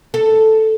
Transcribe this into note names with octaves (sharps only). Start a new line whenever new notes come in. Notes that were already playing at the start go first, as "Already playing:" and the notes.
A4